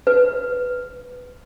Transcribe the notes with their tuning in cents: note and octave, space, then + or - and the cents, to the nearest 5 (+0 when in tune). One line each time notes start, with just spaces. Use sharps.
B4 +5